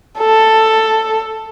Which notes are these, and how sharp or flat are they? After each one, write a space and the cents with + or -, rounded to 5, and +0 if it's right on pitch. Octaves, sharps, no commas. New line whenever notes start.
A4 +5